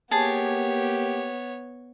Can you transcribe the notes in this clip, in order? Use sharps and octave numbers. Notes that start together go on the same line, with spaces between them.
A#3 B3 G4 G#4 C#5 A5